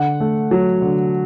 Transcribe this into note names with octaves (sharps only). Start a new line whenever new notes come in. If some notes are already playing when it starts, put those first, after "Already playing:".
Already playing: D3 F#5
A3
F#3
D3